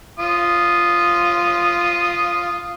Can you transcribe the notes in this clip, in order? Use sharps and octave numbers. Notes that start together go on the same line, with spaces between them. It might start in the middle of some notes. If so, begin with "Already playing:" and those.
F4 D#6